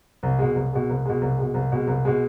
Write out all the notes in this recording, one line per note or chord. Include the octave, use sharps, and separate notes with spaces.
C2
B2 G#3
C2
B2 G#3
C2
B2 G#3
C2
B2 G#3
C2
B2 G#3
C2
B2 G#3